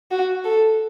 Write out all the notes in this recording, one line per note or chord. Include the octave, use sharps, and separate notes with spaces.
F#4
A4